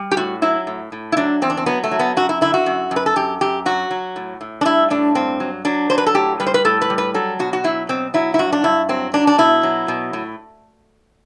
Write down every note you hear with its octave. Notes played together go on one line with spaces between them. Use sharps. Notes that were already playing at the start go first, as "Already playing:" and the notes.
Already playing: G3
G4
A2 F#4
F#3 E4
A2
A2
E4
F#3 D4
E2 C4
D4
C4
F#3 B3
A3
F#3
B3
F#2 F#4
E4
D3 E4
F#4
F#2
F#2
B4
A4
F#2 G4
F#2 G4
F#3 F#4
F#3
A2
A2
D4
G3 E4
A2 D4
G2 C4
F#3
F#3 D4
F#3 C5
B4
A4
A2 G4
G3 B4
C5
B4
A2 A4
B4
G3
B4
F#3 A4
B2 F#4
F#4
F#3 E4
B2 C4
F#3 E4
E4
G2 F#4
D4
G2 E4
F#3 C4
F#3 D4
D4
B2 E4
F#3
B2
A2